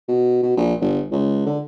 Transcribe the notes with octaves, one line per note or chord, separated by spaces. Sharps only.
B2
B2
A#1
G1
C#2
D3